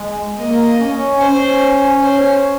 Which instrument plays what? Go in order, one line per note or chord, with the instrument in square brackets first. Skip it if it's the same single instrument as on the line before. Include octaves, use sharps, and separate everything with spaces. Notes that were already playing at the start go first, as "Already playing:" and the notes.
Already playing: [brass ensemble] G#3
[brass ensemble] A#3 [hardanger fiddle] D#5
[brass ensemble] C#4
[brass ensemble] C#4 [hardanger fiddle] C5
[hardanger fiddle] C5